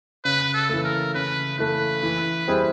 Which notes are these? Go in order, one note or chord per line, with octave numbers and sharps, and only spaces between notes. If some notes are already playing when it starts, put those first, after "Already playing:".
C#3 B4
A4
E3 A3
A#4
C#3 B4
E3 A3 B4
E3
G3 C4 E4 G#4